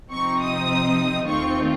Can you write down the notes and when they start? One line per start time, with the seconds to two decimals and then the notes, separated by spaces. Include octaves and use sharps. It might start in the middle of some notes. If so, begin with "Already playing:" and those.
0.11 C3 F3 C4 D#4 C#6
0.40 D#6
1.27 D#2 D#3 A3 C4 F4 C#6